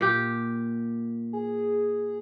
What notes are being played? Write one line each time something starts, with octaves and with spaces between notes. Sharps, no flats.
A#2 G4
G#4